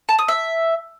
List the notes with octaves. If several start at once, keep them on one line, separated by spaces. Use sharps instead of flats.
A5
D#6
E5